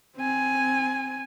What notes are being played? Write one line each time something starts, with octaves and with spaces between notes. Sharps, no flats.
C4 G#5